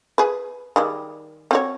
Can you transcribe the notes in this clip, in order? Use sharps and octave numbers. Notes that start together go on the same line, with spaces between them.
G#4 B4
D#3 G3 G#3
C4 F#4 C#5